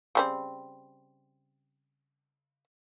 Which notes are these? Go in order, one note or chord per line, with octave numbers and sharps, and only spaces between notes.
C#3 G3 C4